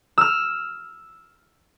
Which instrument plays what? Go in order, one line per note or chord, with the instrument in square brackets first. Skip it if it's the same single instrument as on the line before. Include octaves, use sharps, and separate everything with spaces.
[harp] E6 F6